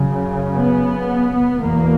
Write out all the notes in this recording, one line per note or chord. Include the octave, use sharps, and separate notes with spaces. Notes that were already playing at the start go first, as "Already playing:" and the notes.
Already playing: F#2 C#3
B3
E2 B2 A#3